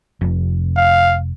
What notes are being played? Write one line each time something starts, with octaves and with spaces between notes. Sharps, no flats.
F1
F5